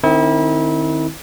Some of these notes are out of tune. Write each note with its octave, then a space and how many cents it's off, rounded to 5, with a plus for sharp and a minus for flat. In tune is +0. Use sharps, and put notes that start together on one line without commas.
D#3 -30 C4 +10 E4 -30